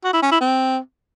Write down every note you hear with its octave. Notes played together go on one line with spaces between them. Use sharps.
F#4
E4
C#4
E4
C4